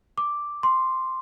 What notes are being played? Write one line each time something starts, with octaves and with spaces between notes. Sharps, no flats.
D6
C6